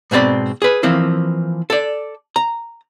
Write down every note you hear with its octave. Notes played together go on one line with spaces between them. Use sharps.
G#2 B2 C4 D5 B5
G#4 B4
E3 F3 A#3 C4 E4
A4 D5
A#5